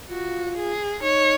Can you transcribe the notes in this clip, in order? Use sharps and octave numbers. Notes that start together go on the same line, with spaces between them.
F4 F#4
G#4
D#4 C#5